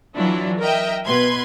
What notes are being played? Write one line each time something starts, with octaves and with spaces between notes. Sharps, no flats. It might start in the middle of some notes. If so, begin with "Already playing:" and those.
E3 F#3 D4 E4 F4
A#4 D#5 E5 G5
B2 B4 C6 G#6